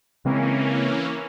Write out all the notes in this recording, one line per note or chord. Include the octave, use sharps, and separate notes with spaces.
C#3 E3 G#3 A#3 C4 C#4